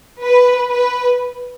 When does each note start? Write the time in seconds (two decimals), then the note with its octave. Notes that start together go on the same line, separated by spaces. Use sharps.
0.23 B4
0.70 B4